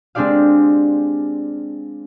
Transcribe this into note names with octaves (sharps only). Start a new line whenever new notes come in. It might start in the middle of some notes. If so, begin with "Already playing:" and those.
G#3 C4 D4 G4 D5 F5